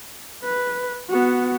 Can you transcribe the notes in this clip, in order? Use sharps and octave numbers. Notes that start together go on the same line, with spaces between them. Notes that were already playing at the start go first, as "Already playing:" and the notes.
B4
B3 F#4